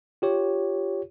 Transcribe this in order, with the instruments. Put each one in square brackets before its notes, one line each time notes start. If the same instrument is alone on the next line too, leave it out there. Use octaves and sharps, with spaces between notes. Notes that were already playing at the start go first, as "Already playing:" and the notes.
[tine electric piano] F4 G4 C#5